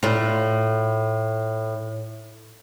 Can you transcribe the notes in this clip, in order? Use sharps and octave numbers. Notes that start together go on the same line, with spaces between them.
A2 F4